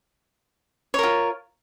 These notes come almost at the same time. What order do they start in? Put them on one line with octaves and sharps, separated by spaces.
C#5 A#4 F4